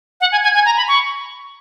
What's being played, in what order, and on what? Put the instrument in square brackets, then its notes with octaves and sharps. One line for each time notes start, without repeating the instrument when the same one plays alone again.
[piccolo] F#5
G#5
G#5
G#5
A#5
B5
C#6